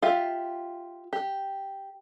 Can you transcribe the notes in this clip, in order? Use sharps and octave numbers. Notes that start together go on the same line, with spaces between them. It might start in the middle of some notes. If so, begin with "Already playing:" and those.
F4 G4 E5
G4